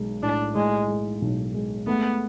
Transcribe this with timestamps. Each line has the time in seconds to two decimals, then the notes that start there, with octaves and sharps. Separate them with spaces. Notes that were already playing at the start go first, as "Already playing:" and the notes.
Already playing: B1 G#3
0.22 A2 D4
0.55 A2 G#3
0.88 G#3
1.22 B1
1.54 G#3
1.87 A3 B3